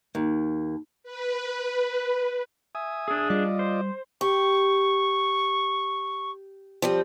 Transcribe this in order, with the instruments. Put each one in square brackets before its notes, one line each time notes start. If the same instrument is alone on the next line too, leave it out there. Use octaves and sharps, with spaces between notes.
[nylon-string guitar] D#2
[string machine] B4
[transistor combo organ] E5 G#5 D#6
[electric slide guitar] D4 G#4
[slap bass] G3 [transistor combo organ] F4 D5 D#5
[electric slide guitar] C5
[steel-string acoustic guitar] G4 [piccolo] C#6
[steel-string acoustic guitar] F3 G3 C4